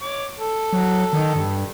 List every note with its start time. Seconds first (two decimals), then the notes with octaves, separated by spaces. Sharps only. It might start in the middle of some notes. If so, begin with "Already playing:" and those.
0.02 C#5 D6
0.38 A4
0.73 F#3
1.13 D#3
1.35 G2